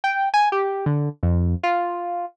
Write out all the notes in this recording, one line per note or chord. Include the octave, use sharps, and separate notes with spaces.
G5
G#5
G4
D3
F2
F4